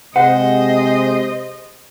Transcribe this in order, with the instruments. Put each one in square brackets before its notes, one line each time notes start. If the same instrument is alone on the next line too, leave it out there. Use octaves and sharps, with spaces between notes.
[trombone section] C3 G#3 [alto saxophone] C5 [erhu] D#5 [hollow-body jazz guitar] F#5